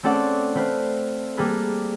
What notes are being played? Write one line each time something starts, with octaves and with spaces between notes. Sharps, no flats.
A3 C4 C#4 A4 D5 F#5
A3 C4 B4 C5 E5 F5
G3 A#3 G#4 A4 B4